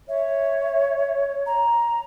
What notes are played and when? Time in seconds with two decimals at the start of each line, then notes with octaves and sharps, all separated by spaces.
0.08 C#5 E5
1.46 A#5